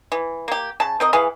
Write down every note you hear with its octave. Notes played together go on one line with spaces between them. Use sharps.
E3
A#3 G4
C#3 A5
C4 A#4 D#5
E3 G#4 F5